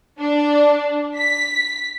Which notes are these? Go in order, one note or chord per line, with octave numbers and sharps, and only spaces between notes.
D4
B6